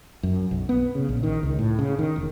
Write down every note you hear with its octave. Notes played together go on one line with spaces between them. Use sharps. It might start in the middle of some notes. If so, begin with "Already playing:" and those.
F#2
B1
B3
C#3
A#1
D#3
C#2
A2
C#3
D#3
E1